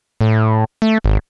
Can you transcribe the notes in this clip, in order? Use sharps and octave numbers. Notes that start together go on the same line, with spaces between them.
A2
A3
G#1